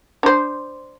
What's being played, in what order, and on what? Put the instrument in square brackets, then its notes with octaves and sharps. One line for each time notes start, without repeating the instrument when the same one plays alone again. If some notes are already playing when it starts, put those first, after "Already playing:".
[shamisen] D4 C5